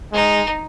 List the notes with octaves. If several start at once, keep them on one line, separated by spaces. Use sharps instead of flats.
G#3 D#4